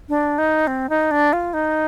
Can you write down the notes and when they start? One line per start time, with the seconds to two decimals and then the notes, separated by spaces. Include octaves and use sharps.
0.09 D4
0.38 D#4
0.67 C4
0.89 D#4
1.11 D4
1.33 F4
1.54 D#4